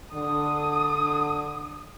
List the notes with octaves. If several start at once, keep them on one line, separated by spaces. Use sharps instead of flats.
D3 D#6